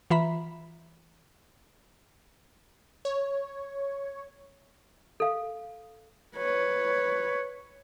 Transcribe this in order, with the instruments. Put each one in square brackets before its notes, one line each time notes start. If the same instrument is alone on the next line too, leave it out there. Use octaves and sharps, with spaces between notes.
[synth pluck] E3 F4 E5 A#5 B5 B6
[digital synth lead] C#5
[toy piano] A4 F5
[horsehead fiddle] B4 C#5